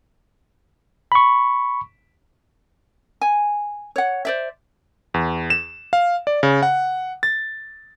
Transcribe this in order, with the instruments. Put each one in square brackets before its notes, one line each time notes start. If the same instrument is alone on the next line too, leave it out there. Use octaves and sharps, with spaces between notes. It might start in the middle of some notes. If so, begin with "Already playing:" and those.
[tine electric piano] B5 C#6
[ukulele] G#5
C#5 F#5
C5 D5 E5
[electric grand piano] E2
E7
F5
D5
C#3
F#5
A6